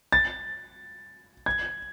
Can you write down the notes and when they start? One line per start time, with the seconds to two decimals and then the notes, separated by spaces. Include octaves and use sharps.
0.12 A6
1.46 G#6